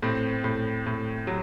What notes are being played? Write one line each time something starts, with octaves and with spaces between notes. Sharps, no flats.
A2 C4
A2
A2
F#3